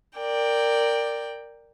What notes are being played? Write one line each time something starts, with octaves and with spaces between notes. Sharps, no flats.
A#4 D5 G5